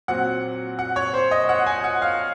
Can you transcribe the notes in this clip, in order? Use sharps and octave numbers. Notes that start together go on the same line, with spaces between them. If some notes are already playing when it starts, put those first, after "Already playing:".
A#2 F#3 C4 F#5
F#5
C#5
C5
D#5
F#5
G#5
F#5
F5